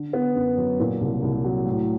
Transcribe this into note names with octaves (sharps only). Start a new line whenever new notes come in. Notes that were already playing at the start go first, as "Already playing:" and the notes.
Already playing: D3
B3
F#2
F#3
A#2
C2
C2
F#3
A2